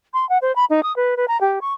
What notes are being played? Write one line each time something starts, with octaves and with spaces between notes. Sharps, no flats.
C6
F#5
C5
B5
D#4
D#6
B4
B4
A#5
G4
C#6